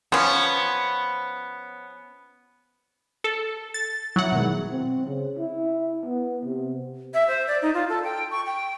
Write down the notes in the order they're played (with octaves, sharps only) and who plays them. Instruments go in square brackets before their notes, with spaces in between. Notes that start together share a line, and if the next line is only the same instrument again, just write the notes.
[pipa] F3 C#4 [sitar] B3
[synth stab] A4
A6
[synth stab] F#3 F#5 [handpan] E4
[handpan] B2 D#3 G#3
[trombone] C4
C#3
E4
B3
C3
[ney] E5
C5
D5
D#4
F4
A4
G5
C#6
G5